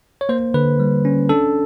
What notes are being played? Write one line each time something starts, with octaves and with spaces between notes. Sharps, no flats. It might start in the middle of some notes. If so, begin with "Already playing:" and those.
C#5
A#3 C5
D3 B4
G3
C#4
D4 A4